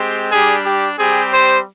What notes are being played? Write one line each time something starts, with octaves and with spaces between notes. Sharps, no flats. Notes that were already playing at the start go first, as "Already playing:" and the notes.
Already playing: G#3 C4 G4
G3 D4 G4 G#4
G4
G3 C4 G4 G#4
C5